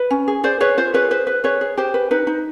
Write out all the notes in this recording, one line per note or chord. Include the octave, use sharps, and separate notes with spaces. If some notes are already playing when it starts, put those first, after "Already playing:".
Already playing: B4
C#4
G#4
G#4 C5 D5
G#4 B4 C#5
F4 C5
G#4 B4 C#5
B4 C5
B4
G#4 B4 C#5
G#4
G4 C5
B4
D#4 B4
D#4